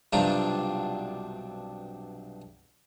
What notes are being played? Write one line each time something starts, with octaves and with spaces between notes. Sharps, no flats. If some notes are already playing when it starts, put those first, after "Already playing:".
B1 G2 C3 D4 F4 A#5